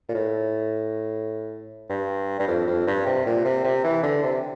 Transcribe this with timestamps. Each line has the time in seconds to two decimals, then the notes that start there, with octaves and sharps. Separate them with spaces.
0.09 A#2
0.14 A2
1.90 G2
2.40 G2
2.48 F2
2.67 F2
2.87 G2
3.06 C3
3.26 A#2
3.45 C3
3.64 C3
3.84 E3
4.03 D3
4.23 C3